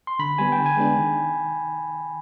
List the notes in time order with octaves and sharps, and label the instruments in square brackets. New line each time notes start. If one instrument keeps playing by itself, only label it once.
[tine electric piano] C6
[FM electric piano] D3 [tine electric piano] B5
[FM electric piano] G3 B3 [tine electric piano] G#5
[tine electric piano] G5
[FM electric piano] D3
[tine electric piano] G#5
[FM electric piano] G#3 B3 D4 G#4
D#3